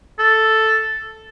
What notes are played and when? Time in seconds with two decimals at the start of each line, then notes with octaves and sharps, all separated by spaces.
0.19 A4